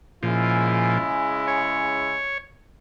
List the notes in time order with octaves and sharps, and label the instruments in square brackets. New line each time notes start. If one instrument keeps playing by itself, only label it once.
[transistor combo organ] A#2 F3 [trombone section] C#3 G#3 E4
[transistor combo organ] C#5